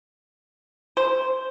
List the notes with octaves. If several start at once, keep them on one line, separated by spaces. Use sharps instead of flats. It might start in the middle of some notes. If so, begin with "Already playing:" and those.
C5